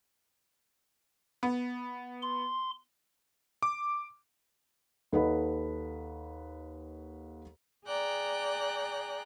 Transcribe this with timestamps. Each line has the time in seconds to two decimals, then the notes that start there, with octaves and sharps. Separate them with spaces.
1.43 B3
2.22 C6
3.63 D6
5.12 D#2 A4 B4 D#5 F#5 B5
7.87 G#4 D5 G5 A#5 F#6